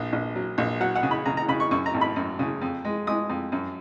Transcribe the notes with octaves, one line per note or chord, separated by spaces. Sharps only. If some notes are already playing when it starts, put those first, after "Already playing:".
Already playing: A#1
A#1
F#3
A#1
F#3 F#5
F#5
C#3
B5
C#3 A#5
A#5
C#3 B5
C#6
F#2 C#6
A#5
G#1
B5
F#2
C#3
F2
G#3
G#3 D#6
F2
F#2